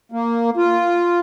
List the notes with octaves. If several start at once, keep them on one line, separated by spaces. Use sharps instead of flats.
A#3
F4